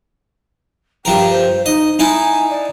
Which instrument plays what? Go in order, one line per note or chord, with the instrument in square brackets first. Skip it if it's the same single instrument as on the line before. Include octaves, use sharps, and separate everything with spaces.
[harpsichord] G2 F3 A#4 [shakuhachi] G5
[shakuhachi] C5
[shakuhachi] D#4 [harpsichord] D#5
[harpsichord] D#4 E4 A5 [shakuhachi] G#5
[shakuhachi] D5